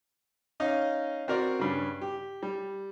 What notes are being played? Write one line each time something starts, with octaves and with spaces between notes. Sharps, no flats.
C#4 D#4 D#5 F5
C4 F#4 A#4 D5
G2 C#3
G4
G3